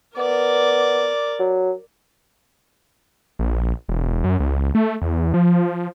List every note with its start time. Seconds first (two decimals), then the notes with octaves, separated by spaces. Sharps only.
0.17 B3 A#4 D5
1.39 F#3
3.39 A#1
3.89 E1
4.24 F#2
4.40 C#2
4.75 A3
5.01 E2
5.34 F3